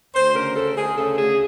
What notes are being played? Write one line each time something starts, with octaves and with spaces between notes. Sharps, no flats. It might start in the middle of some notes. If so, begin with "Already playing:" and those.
D2 C5
C#3 A#4
D2 A4
D2 G#4
C#3 A4
D2 G#4